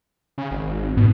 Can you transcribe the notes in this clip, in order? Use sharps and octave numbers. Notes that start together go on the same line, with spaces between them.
C#3
G#1
G#2 B2